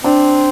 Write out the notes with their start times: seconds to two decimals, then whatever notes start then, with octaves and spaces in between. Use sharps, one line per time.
0.04 C4 D4